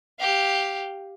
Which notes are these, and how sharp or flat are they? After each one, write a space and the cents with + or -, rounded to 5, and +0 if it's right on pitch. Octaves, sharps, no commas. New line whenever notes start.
G4 +0 F5 +0